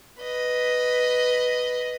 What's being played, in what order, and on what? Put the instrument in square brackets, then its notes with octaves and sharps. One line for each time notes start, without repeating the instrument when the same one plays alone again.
[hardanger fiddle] B4 D#5